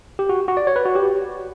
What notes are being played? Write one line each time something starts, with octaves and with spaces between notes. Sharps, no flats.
G4
F#4
F#4
D5
C#5
B4
F#4
G4